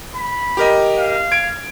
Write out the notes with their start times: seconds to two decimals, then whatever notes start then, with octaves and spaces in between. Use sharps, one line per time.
0.16 B5
0.57 G4 A#4 D#5
0.98 F5
1.32 G#6 D7